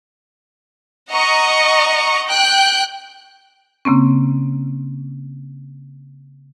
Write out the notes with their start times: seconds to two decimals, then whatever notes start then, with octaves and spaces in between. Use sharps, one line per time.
1.10 D#5 F#5 A#5 C#6
2.27 G5 F#6 G6
3.85 C#3 A#3 C4 C#4